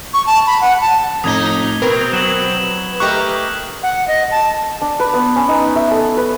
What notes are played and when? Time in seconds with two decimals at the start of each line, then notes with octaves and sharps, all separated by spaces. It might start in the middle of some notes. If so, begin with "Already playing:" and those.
0.14 C#6
0.26 A5
0.47 B5
0.61 F#5
0.81 A5
1.24 F2 A2 D#4 D#6 G#6 G7
1.82 B2 C4 A#4 B4
2.13 F#3 E7 F#7
3.00 A3 G4 A#4 D#5 A#5 C#6 F#6
3.83 F#5
4.08 D#5
4.31 A5
4.82 D4
5.00 B4
5.14 B3
5.36 C#4
5.49 D#4
5.76 E5
5.91 A4
6.17 B4